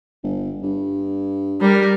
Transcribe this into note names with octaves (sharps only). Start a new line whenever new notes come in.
G1
G2
G3 A#4